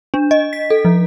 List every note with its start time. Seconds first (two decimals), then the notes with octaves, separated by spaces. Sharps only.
0.14 D4
0.31 D#5
0.53 B6
0.70 A4
0.85 F3